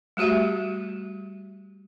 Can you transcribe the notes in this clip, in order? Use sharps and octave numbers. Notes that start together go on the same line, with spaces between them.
G3 A3 F#4 G4 E5